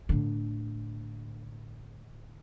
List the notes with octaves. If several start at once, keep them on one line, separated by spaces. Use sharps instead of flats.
A2 D3